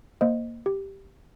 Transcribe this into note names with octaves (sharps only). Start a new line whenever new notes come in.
A#3 C5 D#5
G4